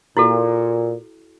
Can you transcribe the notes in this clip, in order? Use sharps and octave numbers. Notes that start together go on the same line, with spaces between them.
A#2 E4 F#4 A4